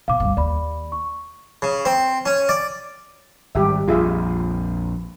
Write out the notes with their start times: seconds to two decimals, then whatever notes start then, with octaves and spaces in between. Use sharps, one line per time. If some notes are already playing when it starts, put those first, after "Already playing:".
0.08 B2 F5 D6
0.20 D2 G2
0.37 D#2 D5 B5
0.92 C#6
1.62 C#3
1.85 C4
2.26 C#4
2.49 D5
3.55 G#1 G3 G4 E5
3.88 A#1 F2 F4 G#4 E5